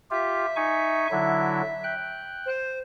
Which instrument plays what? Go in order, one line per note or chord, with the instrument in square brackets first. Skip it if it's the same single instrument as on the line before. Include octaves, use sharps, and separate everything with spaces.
[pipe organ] F4 G4 [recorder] E5
[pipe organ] D#4 G#5 C#6
D3 F#3 E4
G5 F#6
[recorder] C5